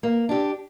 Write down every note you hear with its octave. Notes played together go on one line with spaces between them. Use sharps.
A#3
D4 G4